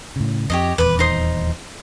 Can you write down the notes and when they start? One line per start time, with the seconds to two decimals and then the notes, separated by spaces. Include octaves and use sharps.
0.16 A2 C#3
0.50 F2 G4 C#5 D#5
0.78 D#1 E2 B4 D6
0.99 D#4 C5 D#6